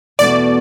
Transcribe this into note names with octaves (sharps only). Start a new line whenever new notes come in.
E2 B2 A3 F#4 D5